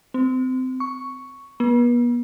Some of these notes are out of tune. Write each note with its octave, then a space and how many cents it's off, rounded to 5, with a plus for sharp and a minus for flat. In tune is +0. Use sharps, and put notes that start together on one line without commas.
C4 -25
C#6 +5
B3 -40